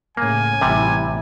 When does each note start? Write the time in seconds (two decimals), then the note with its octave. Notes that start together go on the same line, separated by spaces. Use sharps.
0.17 A2 C#3 A#3 G#5
0.61 A1 C3 G3 E4